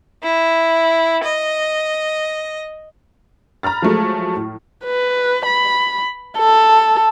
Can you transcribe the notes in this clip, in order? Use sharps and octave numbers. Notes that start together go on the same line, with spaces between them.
E4
D#5
A#5 B5 F6 A6
F3 F#3 G#3 A3
A2
B4
B5
A4